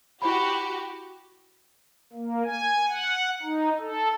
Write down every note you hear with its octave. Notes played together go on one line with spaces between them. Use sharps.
E4 F#4 G4 B5
A#3
G#5
F#5
D#4
A4